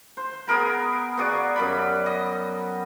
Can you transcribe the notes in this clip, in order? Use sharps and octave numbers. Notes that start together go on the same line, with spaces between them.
C5
B3 G#4 A#4 B5
B3 F#4 G#4 D5
F#2 G3 B5
D#5